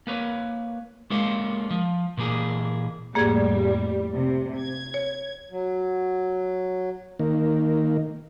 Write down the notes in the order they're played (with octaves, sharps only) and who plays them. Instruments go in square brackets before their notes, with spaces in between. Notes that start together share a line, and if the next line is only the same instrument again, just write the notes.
[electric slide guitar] A#3 B4 C#5
G#3 A#3 C#4 F4 C5
F3
A#2 E3 A#3 G#4
[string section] F2 A2 G3 [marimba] A#3 G#4 G#6
[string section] C3
G#6
[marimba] C#5
[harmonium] F#3
[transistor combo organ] D#3 A#3